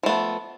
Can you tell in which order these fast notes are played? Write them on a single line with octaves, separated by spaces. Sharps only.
F3 A3 B3